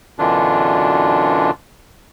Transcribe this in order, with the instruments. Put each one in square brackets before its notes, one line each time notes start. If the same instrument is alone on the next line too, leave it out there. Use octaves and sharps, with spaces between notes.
[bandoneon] F#2 B2 D3 E3 D4 F4